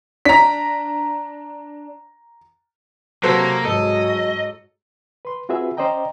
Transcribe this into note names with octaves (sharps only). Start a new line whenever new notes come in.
D4 A#5 B6
C3 F#3 A#3 A4 C5
G#2 F#3 A4 D#5
B4 C6
C4 F4 F#4 G#4 B4 E5
C#4 C5 D5 D#5 G5 A#5